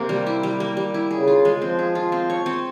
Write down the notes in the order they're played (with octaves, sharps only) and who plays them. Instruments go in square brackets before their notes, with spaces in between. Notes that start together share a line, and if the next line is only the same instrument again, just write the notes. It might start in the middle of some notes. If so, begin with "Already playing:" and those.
Already playing: [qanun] C3 A#3
G3
E4
G3
A#3
G3
E4
[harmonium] C#3 [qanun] G#4
[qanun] F4
G#3
[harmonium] F3 [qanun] C4
[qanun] G#4
F4
C4
C#5
C4